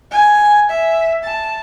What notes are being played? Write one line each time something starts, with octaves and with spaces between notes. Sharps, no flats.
G#5
E5
A5